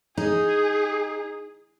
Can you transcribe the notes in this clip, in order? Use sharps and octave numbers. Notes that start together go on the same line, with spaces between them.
D#4 G#4